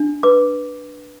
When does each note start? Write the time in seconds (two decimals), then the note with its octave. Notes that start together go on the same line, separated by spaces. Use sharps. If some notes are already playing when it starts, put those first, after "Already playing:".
Already playing: D4
0.23 B4 D6